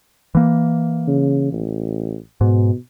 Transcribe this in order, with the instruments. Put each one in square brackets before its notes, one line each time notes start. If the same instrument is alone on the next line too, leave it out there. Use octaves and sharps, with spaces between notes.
[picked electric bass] E3 A#3
[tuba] C#3
A1
[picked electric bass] G#2 [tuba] B2